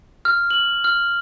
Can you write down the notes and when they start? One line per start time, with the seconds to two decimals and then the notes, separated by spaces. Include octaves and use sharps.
0.25 F6
0.50 F#7
0.84 F6